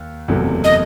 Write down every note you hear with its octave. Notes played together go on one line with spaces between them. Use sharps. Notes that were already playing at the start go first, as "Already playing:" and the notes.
Already playing: D#2
F#1 E2 C3 F#3 A3
D#5